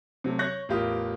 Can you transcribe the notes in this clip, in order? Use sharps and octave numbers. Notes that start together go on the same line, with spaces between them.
C3 F#3 A3
C#5 C#6 F#6 G6 A#6
A1 E2 F4 G4 A#4 D#6